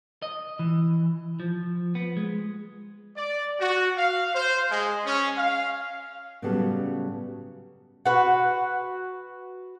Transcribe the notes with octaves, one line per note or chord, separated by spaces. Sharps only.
D#5
E3
F3
B3
G#3
D5
F#4
F5
C5
G#3
C#4
F5
A2 C#3 F#3 G3 B3 A4
F#4 B4